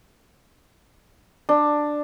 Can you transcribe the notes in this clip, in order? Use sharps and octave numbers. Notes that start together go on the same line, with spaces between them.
D4